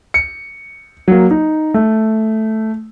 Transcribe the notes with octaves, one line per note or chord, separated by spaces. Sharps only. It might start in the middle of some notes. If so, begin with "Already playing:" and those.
C#7
F#3 A#3
D#4
A3